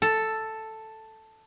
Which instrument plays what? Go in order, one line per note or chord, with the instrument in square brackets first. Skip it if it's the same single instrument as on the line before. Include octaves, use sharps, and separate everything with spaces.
[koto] A4